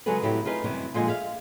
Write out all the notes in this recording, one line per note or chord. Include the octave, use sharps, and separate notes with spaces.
C#3 F#3 G#3 G#4 A4 B4
A2 C3 F#3 E4 G4
D#4 F4 G#4 B4 D#5
F#2 C3 E3 G3
A#2 D3 F3 G#3 D#5 G#5
G#4 E5 F5